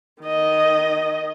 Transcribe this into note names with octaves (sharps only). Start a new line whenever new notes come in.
D#3 D#5